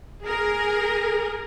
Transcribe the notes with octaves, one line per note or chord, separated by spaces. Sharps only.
G#4 A#4